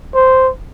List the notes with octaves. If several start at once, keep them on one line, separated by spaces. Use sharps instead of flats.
C5